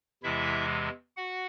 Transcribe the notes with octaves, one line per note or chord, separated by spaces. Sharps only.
E2 C3 E3 G#3 E4 E5
F#4 F#5